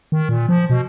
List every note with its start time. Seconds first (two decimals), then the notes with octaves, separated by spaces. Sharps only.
0.12 D#3
0.29 A#2
0.49 F3
0.70 B2